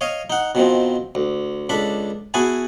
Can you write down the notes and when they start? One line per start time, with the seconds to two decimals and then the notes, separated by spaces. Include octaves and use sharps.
0.01 C#5 D#5 F5
0.30 D#4 F#5
0.55 B2 D#3 F3 C4
1.15 D2
1.69 C#2 D4 A4 B5
2.34 B3 E4 F#4 G#4 G#5 A5